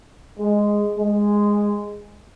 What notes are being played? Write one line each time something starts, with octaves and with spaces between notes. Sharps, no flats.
G#3
G#3